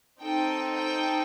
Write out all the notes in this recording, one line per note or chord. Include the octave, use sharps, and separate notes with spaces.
C4 D#4 A4 G5
G5